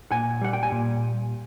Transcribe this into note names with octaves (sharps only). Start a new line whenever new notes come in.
A#2 F#5 G#5
G3 F#5
G5
G#5
A#2